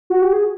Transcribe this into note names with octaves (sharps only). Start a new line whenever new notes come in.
F#4
G4
G#4